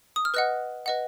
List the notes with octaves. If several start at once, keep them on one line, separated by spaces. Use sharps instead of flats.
D#6
F6
B4 D#5 F#5 F#6
B4 D#5 F#5